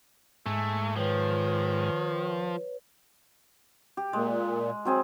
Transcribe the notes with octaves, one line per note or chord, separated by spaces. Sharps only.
G#2 A3 G#5 E6
D#3 F3 B4 C#5
G4
A#2 G#3
F#3 C4 G#4